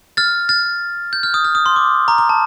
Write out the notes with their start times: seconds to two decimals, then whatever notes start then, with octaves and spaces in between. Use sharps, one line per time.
0.17 F6 A6
0.49 F6 A6
1.13 G6
1.23 F6
1.34 D#6
1.45 F6
1.55 D#6
1.66 C6
1.76 D6
2.08 A#5
2.18 A#5
2.29 A5